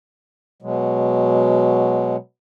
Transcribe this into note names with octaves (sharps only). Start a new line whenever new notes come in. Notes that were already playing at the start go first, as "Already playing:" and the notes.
B2 F#3 G#3